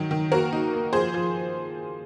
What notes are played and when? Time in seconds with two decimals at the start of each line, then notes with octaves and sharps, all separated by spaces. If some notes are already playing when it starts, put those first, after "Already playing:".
Already playing: D#3 F#3
0.11 D#3
0.32 A#3 F#4 A#4
0.53 D#4
0.73 A#3
0.93 F3 G#4 C5
1.14 F3